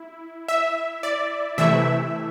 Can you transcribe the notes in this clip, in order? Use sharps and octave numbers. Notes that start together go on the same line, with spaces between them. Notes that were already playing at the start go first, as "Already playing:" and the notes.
Already playing: E4
E5
D5
C3 E3 A3 E4 E5